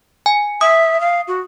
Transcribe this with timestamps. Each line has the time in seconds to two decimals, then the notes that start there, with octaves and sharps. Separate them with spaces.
0.26 G#5
0.61 E5 D#6
1.00 F5
1.28 F#4